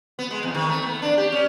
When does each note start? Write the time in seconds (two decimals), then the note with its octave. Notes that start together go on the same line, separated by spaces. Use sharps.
0.19 B3
0.31 G#3
0.43 E2
0.55 D#3
0.69 A3
0.86 B3
1.02 D4
1.18 G4
1.32 C#4